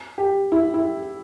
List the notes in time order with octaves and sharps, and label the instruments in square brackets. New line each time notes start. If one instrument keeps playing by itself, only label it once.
[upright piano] G4
E4
E4